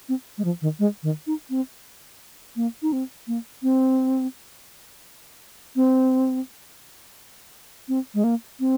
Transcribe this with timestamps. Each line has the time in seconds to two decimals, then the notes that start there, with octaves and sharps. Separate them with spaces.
0.09 C4
0.38 G#3
0.45 F3
0.62 D#3
0.79 G#3
1.03 D#3
1.27 D#4
1.50 C4
2.56 A#3
2.82 D#4
2.93 C4
3.27 A#3
3.63 C4
5.76 C4
7.88 C4
8.14 G#3
8.24 A#3
8.60 C4